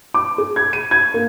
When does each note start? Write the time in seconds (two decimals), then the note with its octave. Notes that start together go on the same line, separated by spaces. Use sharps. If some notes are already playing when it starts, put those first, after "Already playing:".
0.14 D6
0.38 G#4
0.56 G#6
0.73 D#7
0.91 G#6
1.14 A#3